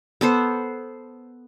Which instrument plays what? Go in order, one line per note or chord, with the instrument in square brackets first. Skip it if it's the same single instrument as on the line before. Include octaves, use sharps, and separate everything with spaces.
[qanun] B3 A4 C5